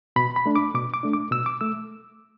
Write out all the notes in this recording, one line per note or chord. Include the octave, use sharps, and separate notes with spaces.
B2 B5
B5
A3 D4
D6
B2 D6
D6
A3 D4
D6
B2 E6
D6
A3 E6